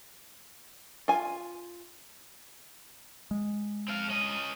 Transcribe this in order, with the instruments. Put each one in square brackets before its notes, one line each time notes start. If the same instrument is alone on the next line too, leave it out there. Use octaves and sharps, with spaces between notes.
[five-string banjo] F4 G#5
[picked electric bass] G#3
[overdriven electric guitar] C4 F5
C#4 D#5